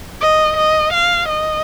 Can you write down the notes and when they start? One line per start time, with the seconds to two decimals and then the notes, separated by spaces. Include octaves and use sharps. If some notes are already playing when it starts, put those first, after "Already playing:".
0.21 D#5
0.57 D#5
0.94 F5
1.29 D#5